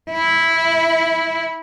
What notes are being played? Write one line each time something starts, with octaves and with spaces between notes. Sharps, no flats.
E4